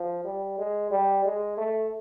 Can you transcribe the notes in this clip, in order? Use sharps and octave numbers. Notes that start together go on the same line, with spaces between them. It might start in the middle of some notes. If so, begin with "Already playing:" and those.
Already playing: F3
G3
G#3
G3
G#3
A3